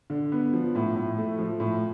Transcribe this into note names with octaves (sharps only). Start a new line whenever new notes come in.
D3
B3
F3
A2
A2
A3
F3
A2